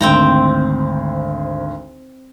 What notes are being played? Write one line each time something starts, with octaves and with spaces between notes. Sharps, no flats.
G#1 D2 C4 G5 A#5